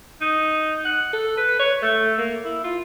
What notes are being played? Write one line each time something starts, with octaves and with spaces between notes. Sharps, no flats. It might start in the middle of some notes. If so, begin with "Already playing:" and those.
D#4
F#5
A4
B4
C#5
A3
A#3
E4
F4